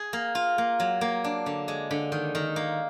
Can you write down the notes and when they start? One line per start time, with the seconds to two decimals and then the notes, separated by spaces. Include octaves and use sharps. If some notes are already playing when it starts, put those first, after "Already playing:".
Already playing: G#4
0.13 A#3
0.35 F4
0.58 A#3
0.80 F#3
1.01 A#3
1.24 D4
1.46 D3
1.68 G#3
1.91 D3
2.12 D#3
2.35 D#3
2.56 A#3